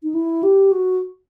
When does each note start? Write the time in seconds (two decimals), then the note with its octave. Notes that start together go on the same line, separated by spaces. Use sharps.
0.03 D#4
0.14 E4
0.43 G4
0.72 F#4